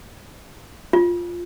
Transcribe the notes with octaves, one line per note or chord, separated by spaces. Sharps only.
F4